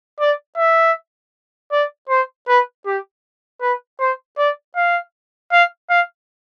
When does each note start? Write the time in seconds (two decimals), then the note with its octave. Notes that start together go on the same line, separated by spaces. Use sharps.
0.20 D5
0.58 E5
1.72 D5
2.10 C5
2.48 B4
2.86 G4
3.61 B4
4.00 C5
4.38 D5
4.76 F5
5.52 F5
5.90 F5